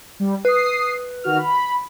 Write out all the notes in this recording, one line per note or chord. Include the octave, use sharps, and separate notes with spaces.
G3
B4 D#6 C7
D#3 F#4 F6
B5